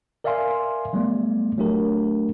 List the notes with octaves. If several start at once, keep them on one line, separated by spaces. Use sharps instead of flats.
A#4 D5 E5 F5 G#5 C6
F#3 G3 A3 B3 D5
F#3 A3 D4 G4 A#4